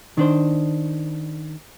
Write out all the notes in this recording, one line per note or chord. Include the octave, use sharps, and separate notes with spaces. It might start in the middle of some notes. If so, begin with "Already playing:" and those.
D#3 D4 C5